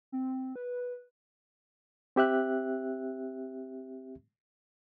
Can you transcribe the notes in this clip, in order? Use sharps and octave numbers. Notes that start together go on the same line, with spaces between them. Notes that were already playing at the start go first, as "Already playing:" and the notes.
C4
B4
C4 G4 E5 F#6